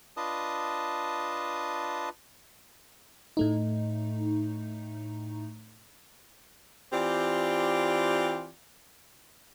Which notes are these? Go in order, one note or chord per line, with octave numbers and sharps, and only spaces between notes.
D4 F4 B4 D#5 A5 D#6
A2 A3 D#4
E3 C4 F4 G4 D5